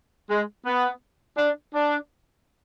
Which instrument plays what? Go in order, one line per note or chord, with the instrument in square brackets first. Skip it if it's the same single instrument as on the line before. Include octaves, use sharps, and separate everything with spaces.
[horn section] G#3
B3
D4
D4